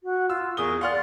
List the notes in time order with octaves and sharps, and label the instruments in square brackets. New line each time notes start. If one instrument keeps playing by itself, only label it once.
[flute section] F#4
[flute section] F4 [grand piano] E6
[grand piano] E2 D#6 G7 [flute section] G#4 A#4 C#6
[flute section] D5 C6 [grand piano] F5 F#5 F6